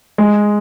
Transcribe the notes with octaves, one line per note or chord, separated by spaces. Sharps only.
G#3